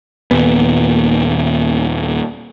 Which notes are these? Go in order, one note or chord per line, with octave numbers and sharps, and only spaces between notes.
D#2 A#2 B3